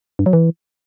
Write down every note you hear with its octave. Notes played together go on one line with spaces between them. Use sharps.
G2
F#3
E3